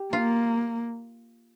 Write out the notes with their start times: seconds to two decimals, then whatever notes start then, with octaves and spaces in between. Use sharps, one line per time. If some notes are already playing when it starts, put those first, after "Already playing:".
Already playing: G4
0.13 A#3 F4